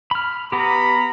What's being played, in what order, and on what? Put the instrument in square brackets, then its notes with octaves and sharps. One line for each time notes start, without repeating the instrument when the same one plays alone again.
[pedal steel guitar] B5 F6
[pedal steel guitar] B3 G4 [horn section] A#5 [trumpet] B5